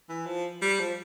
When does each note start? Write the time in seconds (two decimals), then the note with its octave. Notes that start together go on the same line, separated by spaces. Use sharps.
0.09 E3
0.26 F3
0.62 G3
0.80 F3